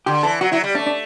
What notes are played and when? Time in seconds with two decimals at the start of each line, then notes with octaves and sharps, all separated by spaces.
0.06 D3 G4
0.23 E3 A4
0.41 F#3 F#4
0.52 F#3 E4
0.64 G3
0.75 A3 D4
0.86 D4